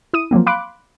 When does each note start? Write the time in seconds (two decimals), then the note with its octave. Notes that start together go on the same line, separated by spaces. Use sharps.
0.13 E4 D#6 D#7
0.31 F3 F#3 A#3 C4
0.46 F5 B5 C6 D6 F#6 D7